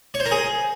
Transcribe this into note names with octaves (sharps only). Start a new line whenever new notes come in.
C#5
C5
A#4
G#4